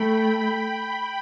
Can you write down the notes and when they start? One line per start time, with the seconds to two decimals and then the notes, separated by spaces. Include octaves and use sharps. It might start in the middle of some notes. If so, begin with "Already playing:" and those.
Already playing: A3 G5 B5
0.10 G5 B5